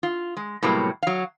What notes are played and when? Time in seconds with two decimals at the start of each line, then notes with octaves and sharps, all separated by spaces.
0.03 F4
0.37 G#3
0.63 A2 C3 F#3 G3 A#3 B3
1.03 F#3 F5